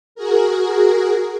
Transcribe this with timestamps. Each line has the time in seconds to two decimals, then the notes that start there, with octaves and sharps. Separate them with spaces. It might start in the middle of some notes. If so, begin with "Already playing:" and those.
0.15 F#4 G#4 A#4